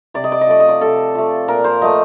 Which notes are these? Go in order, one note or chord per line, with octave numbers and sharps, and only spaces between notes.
C3 D5
D#5
D5
D#5
F3 A3 D5
D#5
D5
C3 A4
F3 A3
A#2 A#4
C5
F3 A3 D#5